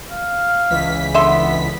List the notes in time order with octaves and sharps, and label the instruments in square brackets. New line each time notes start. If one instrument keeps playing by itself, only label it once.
[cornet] F5
[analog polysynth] C#2 E3 B6
[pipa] D3 E5 C6 [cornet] B3